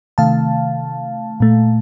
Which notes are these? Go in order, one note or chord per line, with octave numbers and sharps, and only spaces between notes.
C3 D#3 A3 F5 A5
A#2 A3